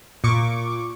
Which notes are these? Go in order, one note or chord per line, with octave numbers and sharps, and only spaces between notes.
A#2 C#6 D6